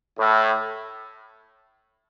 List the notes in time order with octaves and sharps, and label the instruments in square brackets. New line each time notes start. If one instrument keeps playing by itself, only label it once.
[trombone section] A2